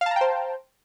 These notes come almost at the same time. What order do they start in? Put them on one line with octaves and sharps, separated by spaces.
F5 A5 A#5 G5 C5